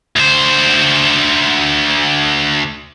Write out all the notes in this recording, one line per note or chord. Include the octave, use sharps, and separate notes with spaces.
D2 C5